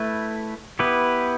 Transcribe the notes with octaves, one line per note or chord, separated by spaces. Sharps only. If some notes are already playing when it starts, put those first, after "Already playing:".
Already playing: A3 E4 B4
B3 E4 G4 B4